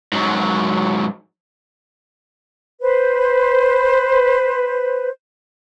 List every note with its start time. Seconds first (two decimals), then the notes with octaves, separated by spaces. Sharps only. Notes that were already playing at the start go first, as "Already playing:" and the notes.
0.13 G#2 F#3
2.82 B4 C5